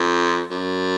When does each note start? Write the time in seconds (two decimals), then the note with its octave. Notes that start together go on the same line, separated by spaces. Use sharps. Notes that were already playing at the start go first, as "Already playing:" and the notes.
Already playing: F2
0.51 F#2